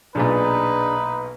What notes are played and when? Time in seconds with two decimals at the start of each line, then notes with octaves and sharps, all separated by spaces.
0.15 B1 A#2 D4 D#4 G#4 B4 D5